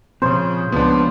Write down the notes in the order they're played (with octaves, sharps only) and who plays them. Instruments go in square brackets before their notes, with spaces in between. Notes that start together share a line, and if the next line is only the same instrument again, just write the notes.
[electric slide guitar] A#2 F3 C4 [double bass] C#3 [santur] C5
[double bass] C#2 F3 [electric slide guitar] C#3 G#3 A#3 [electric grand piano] B3 D4